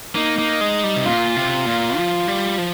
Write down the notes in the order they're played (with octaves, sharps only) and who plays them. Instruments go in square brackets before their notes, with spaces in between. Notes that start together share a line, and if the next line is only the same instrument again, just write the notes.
[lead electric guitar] A#3 [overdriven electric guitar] D#4
[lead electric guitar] A#3
G#3
G3
C3
[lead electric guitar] A#2 [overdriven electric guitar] F4
[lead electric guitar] C3
A#2
F3
G3
F3